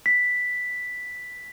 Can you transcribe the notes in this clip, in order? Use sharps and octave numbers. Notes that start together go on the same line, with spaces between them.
B6